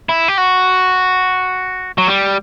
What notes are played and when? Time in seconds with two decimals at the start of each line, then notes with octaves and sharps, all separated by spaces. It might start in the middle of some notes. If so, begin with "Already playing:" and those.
0.09 E4
0.28 G4
0.38 F#4
1.98 F#3
2.08 G3